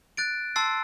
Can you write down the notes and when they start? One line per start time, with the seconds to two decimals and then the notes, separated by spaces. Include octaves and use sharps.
0.17 F#6 A6 D7
0.56 A5 C6 E6 A6 C7